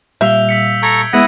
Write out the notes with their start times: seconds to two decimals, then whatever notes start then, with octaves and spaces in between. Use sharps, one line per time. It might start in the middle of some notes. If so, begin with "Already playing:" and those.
0.21 A#2 G3 E5 F5 G6 F7 G7
0.49 E6 B6 C#7
0.83 A4 A#5 C#6 G#6 D7
1.13 G#3 B3 E4 F#5 D#6 A#6